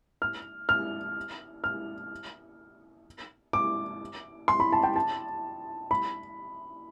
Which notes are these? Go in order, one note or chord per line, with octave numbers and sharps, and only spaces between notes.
F6
F6
F6
D6
C6
B5
A5
G5
A5
B5